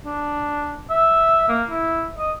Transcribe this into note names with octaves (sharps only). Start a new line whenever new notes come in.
D4
E5
A#3
E4
D#5